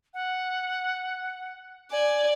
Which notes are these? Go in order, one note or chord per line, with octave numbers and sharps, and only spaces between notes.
F#5
D5 G#5